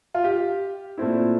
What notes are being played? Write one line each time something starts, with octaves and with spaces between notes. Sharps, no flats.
F4
G4
A#2 A3 C4 E4